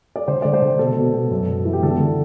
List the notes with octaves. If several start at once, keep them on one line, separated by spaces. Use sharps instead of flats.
D5
D3 C5
D3 D5
C5
D3
B2 A4
B2
B2
F#2
F#2
E3
G4
D3 A4
D3